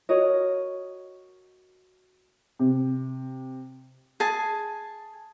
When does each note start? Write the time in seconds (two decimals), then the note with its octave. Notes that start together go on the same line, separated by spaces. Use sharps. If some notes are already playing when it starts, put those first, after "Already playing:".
0.09 F#4 A#4 C#5 D#5
2.59 C3
4.20 G#4 G#5 A5